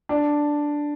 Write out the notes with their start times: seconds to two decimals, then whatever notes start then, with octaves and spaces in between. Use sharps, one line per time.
0.09 D4